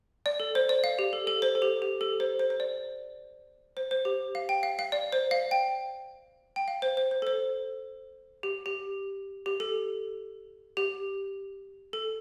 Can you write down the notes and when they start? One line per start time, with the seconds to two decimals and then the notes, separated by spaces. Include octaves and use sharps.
0.26 D5
0.40 A4
0.55 C5
0.69 D5
0.84 F5
0.99 G4
1.13 A4
1.27 A4
1.42 C5
1.55 A4
1.62 G4
1.82 G4
2.01 A4
2.20 C5
2.39 C5
2.50 C5
2.60 D5
3.77 C5
3.91 C5
4.05 G4
4.35 F5
4.49 G5
4.63 F5
4.79 F5
4.92 D5
5.12 C5
5.31 F5
5.51 G5
6.56 G5
6.68 F5
6.82 C5
6.97 C5
7.11 C5
7.22 A4
7.27 C5
8.43 G4
8.66 G4
9.46 G4
9.60 A4
10.77 G4
11.93 A4